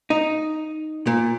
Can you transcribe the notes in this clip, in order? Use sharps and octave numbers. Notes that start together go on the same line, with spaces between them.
D#4
A#2